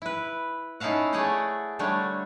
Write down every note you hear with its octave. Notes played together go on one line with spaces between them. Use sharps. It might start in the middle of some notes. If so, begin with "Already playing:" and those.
E4 B4
C#4 D#4 E4 A4 F5 F#5
A3 G#4 C#5 D5 F#5 G5
D3 G3 A3 D4 C#5